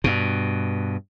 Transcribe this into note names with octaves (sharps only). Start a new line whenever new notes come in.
G2 B2